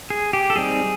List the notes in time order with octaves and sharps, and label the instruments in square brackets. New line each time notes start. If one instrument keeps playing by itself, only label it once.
[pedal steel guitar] G#4
G4
A4
G3 C4 D#4 G#4